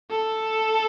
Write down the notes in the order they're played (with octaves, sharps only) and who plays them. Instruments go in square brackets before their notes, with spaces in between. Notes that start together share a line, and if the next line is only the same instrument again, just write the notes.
[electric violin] A4